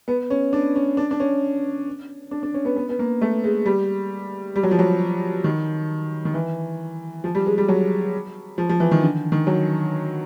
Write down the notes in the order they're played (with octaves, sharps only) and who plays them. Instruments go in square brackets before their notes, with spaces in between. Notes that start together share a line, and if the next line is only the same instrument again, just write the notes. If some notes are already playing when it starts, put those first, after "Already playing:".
[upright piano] B3
C#4
D4
C#4
D4
D4
C#4
D4
D4
C#4
B3
B3
B3
A#3
A3
G#3
G3
G3
F#3
F3
F#3
D#3
D#3
E3
F3
G3
G#3
G3
F#3
F3
F3
E3
D#3
D3
D#3
F#3